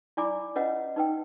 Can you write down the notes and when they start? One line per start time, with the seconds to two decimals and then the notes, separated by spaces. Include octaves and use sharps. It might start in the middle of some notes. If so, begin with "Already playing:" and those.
0.17 E4 D5 G#5 B5 D6
0.56 C#4 F4 B4 D#5 F#5
0.96 D#4 B4 G5